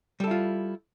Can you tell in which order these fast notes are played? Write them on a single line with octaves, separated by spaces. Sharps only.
G3 A4 E4 F4